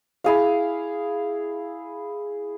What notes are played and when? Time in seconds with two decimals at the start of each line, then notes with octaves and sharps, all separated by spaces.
0.24 E4 G#4 F5